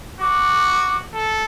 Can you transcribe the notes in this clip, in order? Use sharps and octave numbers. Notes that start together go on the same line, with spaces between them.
F#4 D6
A4